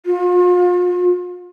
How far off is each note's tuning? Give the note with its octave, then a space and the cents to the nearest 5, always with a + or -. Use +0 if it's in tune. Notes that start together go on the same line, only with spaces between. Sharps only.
F4 +40